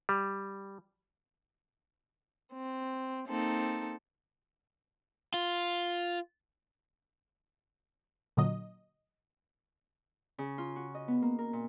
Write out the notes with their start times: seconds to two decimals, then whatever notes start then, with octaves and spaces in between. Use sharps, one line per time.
0.09 G3
2.53 C4
3.28 A#3 C4 D#4 A4
5.34 F4
8.37 A#2 D3 F#3 D#5
10.38 C#3
10.58 F4
10.76 F#4
10.95 D#5
11.08 B3
11.22 A#3
11.39 A#4
11.53 A#2